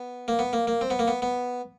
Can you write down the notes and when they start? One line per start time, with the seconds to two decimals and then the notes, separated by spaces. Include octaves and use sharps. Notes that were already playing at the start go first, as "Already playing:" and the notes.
Already playing: B3
0.28 A#3
0.39 B3
0.53 A#3
0.67 A#3
0.81 C4
0.90 B3
0.99 A#3
1.08 B3
1.22 B3